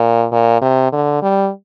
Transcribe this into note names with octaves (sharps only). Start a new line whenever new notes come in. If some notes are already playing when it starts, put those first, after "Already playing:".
Already playing: A#2
A#2
C3
D3
G3